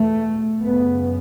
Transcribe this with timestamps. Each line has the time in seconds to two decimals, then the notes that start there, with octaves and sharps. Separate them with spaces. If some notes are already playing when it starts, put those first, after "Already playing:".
Already playing: E2 B2 A3
0.62 F#2 C#3 B3